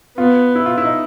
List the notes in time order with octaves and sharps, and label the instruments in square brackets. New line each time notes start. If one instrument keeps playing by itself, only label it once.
[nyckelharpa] B3 [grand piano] F4
[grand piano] E4
F4
E4
D#4